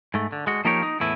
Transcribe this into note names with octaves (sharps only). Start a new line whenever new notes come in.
G#2 A3
D3
G#3 F#4
F3 A#3 D#4 G4 A#4 C#5
D#4
E2 A2 E4 B4